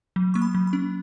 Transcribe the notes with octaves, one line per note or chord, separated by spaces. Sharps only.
F#3
A#3 C#6
B5
F#3
B5
C#4